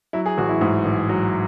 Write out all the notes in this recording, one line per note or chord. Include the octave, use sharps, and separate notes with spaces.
F#3 E4
G#4
A1 F#4
E4
G#2
A1
F#3